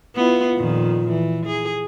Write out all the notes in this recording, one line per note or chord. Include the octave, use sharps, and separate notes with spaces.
B3 E4 F4
F2 A#2 D#3
E3
G#4